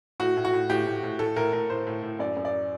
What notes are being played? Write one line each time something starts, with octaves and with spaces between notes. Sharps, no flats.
A2 F#4
A2
F#4
A2
A2 G4
A2
A2
A2 A4
A2 A#4
A2 A#4
A2 C5
A2
A2
F#2 D5
F#2
D5